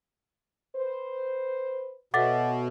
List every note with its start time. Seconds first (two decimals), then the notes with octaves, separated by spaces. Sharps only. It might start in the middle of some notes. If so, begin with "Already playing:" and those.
0.76 B4 C5
2.14 B2 A4 C#5 E5 F#5 D6 A6